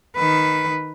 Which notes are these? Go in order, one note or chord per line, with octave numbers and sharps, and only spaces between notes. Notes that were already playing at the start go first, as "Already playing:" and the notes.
D#3 B4